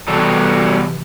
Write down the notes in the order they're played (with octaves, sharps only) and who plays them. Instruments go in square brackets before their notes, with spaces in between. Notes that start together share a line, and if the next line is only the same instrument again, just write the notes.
[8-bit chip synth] C3 E3 [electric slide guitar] G3 B3 F#4 A4